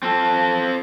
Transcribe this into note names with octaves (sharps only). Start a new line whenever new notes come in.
C4 A4